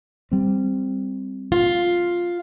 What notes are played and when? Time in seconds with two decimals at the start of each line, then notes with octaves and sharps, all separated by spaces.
0.31 G3 C4
1.52 F4